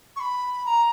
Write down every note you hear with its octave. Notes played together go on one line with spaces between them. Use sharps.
C#6
B5
A#5